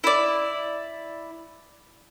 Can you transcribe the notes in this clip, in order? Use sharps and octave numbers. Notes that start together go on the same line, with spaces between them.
E4 D5